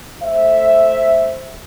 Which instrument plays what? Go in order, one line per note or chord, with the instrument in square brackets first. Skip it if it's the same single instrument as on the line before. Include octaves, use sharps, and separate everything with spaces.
[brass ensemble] A3 C5 E5